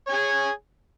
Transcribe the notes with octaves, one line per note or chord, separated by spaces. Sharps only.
G#4 C#5 G#5